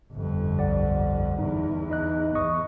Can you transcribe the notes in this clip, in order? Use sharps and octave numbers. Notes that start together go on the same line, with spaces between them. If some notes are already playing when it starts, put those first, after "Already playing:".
G1 F2
B1 D5 F#5
E2 D#4
D#4 D#5 F#6
E2 D#5 C#6 D#6